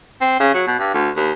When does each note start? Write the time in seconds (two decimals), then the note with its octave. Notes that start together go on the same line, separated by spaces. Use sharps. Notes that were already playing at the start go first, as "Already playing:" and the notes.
0.21 C4
0.40 C#3
0.54 F#3
0.67 B2
0.79 G2
0.94 D2
1.17 D#2